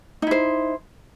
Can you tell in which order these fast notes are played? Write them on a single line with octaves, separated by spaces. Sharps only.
D#4 E4 C5